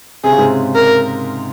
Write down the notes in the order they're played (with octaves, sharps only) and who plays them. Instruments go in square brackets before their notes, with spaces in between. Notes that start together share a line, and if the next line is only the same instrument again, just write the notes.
[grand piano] C3 [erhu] G#4
[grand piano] C#3
G#2 C3
[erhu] A#4